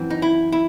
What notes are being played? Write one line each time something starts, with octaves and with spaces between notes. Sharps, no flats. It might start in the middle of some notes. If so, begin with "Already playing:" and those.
Already playing: F#2 E3 C4
D#4
E4
E4